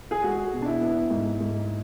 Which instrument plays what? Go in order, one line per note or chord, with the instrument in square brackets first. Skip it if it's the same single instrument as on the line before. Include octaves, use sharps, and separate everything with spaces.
[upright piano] G#4
G#3 F#4
B2
D4
E4
B3
G#2
G#2